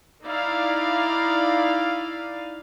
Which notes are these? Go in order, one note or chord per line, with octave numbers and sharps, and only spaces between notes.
D#4 E4 D5 F5